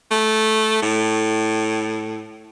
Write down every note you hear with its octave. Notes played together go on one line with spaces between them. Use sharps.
A3
A2